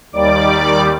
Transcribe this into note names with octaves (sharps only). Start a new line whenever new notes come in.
D#2 D#3 G3 D5 D6